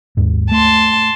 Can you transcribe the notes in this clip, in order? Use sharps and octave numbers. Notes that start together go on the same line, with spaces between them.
D#2 G#2
A3 A5 C6